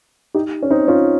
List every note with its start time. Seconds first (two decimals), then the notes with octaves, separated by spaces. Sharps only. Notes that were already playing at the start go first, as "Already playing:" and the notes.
0.34 D#4 G4
0.63 C#4
0.70 C4 D#4
0.88 C#4 F4